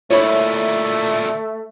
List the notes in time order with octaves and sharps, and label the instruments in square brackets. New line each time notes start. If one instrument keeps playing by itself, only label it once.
[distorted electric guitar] D2 A#2 [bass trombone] A3 [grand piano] E4 [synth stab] C#5 B5